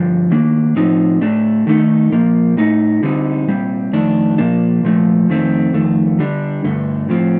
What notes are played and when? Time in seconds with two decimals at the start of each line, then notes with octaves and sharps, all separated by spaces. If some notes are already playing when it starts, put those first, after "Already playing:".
Already playing: G2 D3 F3
0.31 D#3 A#3 D4
0.76 A2 F3 C4 D#4
1.21 A2 A3 D4
1.67 D#3 A3 D#4
2.12 A#2 F3 A#3
2.57 A2 A3 D#4
3.03 D3 G3 C4 D#4
3.48 A#2 G3 C4
3.93 F2 D#3 A3 D4
4.38 A#2 F3 A#3 D4
4.83 A#2 F3 A3
5.29 F2 D#3 A3 C4
5.73 F2 D#3 A3
6.19 D3 G3 D4
6.64 G2 D3 A3
7.09 A2 F3 C4